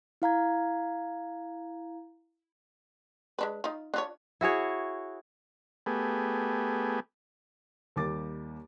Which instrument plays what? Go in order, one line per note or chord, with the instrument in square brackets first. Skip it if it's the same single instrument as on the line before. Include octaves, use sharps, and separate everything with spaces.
[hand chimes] E4 F5 A#5 G#6
[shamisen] G#3 D4 B4
D#4 F4
D4 F4 C#5
[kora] E4 F#4 G#4 C#5
[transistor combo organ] A3 B3 G4 G#4
[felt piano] D#2 G3 A#3 D6 A6